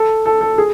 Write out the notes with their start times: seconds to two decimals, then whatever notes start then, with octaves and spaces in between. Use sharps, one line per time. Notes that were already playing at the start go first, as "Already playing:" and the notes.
Already playing: A4
0.26 A4
0.41 A4
0.58 G#4